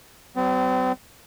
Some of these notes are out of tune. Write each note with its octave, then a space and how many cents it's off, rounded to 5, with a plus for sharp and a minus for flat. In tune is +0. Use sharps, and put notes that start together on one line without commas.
F#3 +45 C4 -40